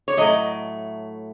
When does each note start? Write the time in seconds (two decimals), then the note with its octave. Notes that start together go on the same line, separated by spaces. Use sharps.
0.08 C#5
0.17 A2 F#3 A3 D#5